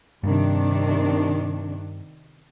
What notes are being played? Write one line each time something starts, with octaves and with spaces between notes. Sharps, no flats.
G2 C3 D#3 D4